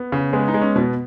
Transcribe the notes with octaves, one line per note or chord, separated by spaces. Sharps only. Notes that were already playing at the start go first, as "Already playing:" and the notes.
Already playing: B3
C#3
G#3 B3
D#4
G#3
C#4
B2 B3